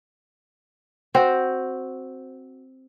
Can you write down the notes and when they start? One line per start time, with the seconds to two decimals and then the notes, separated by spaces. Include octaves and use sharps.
1.14 C4 F#4 C5